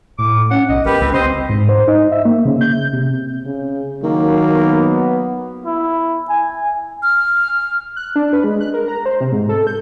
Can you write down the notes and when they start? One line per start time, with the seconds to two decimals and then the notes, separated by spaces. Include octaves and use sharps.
0.19 A2 D6
0.51 C#4 F#5
0.69 B1 D#5
0.86 G1 G4 A#4 B4
1.01 C#2 C4
1.14 C4 C5 D#5 C6
1.49 G#2
1.69 C5
1.88 D#4
2.12 E5
2.25 A#3
2.45 C#3
2.61 G6
2.93 C3
3.46 C#3
4.03 D#3 F#3 A#3
4.54 B3
5.65 E4
6.29 G#5
7.03 F6
7.96 F#6
8.16 D4
8.33 B4
8.44 G#3
8.60 F#6
8.74 A#4
8.88 A#5
9.06 C5
9.21 C3
9.32 G#2
9.49 A4
9.67 G6